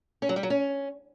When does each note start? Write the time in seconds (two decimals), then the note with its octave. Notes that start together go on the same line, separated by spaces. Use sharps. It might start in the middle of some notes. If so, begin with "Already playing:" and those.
0.22 C#4
0.29 F#3
0.36 G3
0.43 F#3
0.50 C#4